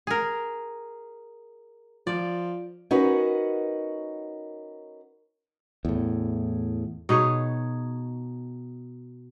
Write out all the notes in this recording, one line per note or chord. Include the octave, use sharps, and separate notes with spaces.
G#4 A#4
F3 D5
C#4 D#4 F#4 A#4 B4
E2 A2
B2 D#4 G#4 C#5